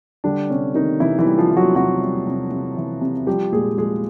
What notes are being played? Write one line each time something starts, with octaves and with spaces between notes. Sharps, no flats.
D3 G3 D4
C3 C#4
C3 D#3 D#4
C3 E3 E4
E3 E4
G3
F3 F4
E3
F#3 F#4
C3 F#3 F#4
G3
C3
C3
E3
C3
F3 G3 G4
A#2 G#3 G#4
F3 G#3 G#4